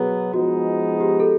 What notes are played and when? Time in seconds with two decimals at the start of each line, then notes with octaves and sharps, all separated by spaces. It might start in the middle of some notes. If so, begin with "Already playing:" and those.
Already playing: B2 F#3 B3 G#4
0.33 F3 G#3 B3 D#4 F#4
1.00 G4
1.10 G#4
1.20 A4